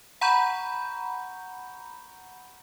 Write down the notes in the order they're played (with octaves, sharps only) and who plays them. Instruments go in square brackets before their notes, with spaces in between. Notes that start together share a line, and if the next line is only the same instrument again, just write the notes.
[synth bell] F#5 A#5 B5 C#6 G6